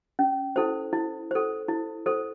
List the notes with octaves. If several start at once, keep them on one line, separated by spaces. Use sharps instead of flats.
C#4
E4 A4 C5
E4
A4 C5
E4
A4 C5